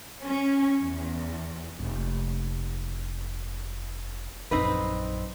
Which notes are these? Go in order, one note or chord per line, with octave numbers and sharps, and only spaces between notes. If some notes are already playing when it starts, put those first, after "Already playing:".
C#4
E2
F1 A#3
A#1 F#2 C4 D#4 B4